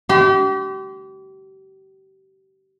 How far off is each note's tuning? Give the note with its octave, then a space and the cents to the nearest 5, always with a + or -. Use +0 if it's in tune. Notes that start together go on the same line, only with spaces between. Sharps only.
G4 -35 C6 -35